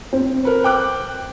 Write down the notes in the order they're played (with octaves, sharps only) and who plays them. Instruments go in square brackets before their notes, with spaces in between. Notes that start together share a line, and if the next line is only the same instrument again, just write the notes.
[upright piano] C4
[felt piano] A#4 B4
G5 D6 F#6